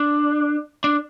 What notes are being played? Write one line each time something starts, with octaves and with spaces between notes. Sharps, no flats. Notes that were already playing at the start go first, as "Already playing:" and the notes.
Already playing: D4
D4